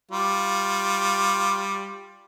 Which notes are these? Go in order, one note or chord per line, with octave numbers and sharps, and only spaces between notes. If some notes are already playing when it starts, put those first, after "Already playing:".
G3 F4